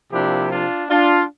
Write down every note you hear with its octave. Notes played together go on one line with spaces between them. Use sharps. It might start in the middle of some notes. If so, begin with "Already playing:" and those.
C3 F3 A#3 D4 E4 G4
D4 F4
D4 F4